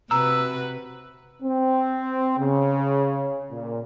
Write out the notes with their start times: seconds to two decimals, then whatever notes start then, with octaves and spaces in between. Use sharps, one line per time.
0.11 C3 F#4 B4 A#5 E6
1.42 C4
2.37 C#3
3.51 A#2